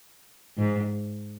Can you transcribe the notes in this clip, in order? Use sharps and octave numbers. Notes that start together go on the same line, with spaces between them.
G#2